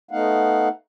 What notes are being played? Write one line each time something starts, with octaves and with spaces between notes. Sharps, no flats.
A3 B3 D#4 F5 F#5